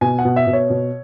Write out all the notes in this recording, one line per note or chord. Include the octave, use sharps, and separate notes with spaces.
B2 G#5
F#5
B2
E5
B2
C#5
B2